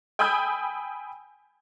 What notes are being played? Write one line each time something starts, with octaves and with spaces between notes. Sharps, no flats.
G5 G#5 B5 D#6 E6 G6